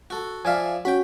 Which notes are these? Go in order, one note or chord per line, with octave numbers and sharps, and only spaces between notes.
F#4 A4
F3 D5 E5 F5 G#5
C#4 F#4 G5 B5